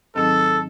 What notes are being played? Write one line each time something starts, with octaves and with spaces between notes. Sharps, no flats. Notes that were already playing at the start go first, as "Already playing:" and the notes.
G#2 D#3 F#3 C4 D#4 A4